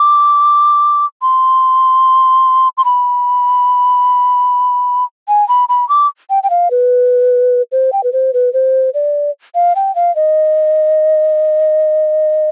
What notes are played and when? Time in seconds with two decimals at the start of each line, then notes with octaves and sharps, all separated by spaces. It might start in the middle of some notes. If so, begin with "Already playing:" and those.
Already playing: D6
1.22 C6
2.78 C6
2.85 B5
5.28 G#5
5.49 B5
5.69 B5
5.89 D6
6.30 G5
6.43 G5
6.50 F5
6.71 B4
7.72 C5
7.93 G5
8.04 B4
8.13 C5
8.34 B4
8.53 C5
8.94 D5
9.55 F5
9.76 G5
9.95 F5
10.16 D#5